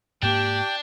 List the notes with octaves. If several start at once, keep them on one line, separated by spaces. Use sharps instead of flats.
G#2 A#3 D4 G4 G5